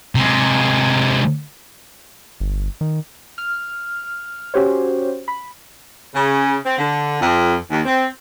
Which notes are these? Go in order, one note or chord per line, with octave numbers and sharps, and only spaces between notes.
C3 G#3
G1
D#3
F6
C#4 F#4 G4 C5 C#5
B5
C#3
C4
D3
F2
D#2
C4